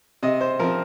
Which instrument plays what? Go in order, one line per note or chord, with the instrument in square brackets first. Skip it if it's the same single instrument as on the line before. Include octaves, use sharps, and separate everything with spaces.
[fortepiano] C3 D#5
C5
F3 C4 A#4